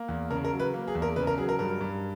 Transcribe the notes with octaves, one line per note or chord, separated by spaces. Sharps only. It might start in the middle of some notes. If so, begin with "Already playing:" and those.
Already playing: A#3
E2
C#3 A#4
A#4
F#3
B4
A#3
G#4
E2
A#4
C#3 B4
A#4
F#3 G#4
A#4
G2 A#4
G2